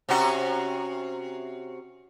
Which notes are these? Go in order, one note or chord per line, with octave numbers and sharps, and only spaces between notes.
C3 C#4 F#4